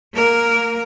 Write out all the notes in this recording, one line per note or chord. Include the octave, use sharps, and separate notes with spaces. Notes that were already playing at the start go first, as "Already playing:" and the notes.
A#3 A#4